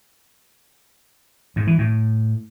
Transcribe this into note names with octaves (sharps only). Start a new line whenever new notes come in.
G#2
E3
A2